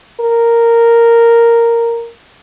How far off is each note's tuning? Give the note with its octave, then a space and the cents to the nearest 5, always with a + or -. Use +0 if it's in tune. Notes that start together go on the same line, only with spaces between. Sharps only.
A#4 -5